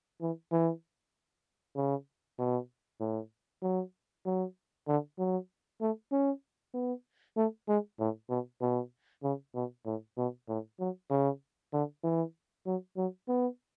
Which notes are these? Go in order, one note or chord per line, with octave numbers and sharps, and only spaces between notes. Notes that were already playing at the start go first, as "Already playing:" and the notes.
E3
E3
C#3
B2
A2
F#3
F#3
D3
F#3
A3
C#4
B3
A3
G#3
A2
B2
B2
C#3
B2
A2
B2
A2
F#3
C#3
D3
E3
F#3
F#3
B3